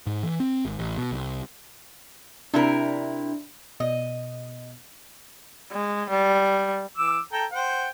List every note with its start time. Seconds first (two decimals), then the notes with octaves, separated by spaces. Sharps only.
0.06 G#2
0.23 E3
0.40 C4
0.65 G#1
0.79 A1
0.98 B2
1.11 C2
2.54 C3 D4 E4 A#4
3.80 B2 D#5
5.72 G#3
6.09 G3
6.97 E3 D6 E6
7.32 A4 G5 A#5
7.52 C5 F#5 G5